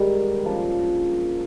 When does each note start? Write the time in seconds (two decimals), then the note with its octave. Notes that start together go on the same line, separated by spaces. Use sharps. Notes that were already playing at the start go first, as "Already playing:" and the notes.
Already playing: G#2 D#3 G3
0.44 C#3 F3 A#3 D4